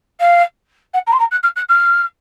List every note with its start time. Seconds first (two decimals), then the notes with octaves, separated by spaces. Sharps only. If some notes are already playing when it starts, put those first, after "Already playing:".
0.20 F5
0.94 F#5
1.07 A#5
1.13 C6
1.19 A#5
1.31 F#6
1.43 F6
1.56 F#6
1.69 F6